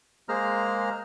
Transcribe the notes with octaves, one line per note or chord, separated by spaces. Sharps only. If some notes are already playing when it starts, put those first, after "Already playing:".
G#3 A#3 G#4 C5 A#5 F6